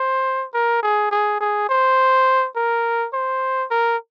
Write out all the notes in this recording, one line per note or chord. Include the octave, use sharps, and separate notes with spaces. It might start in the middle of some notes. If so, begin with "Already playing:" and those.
Already playing: C5
A#4
G#4
G#4
G#4
C5
A#4
C5
A#4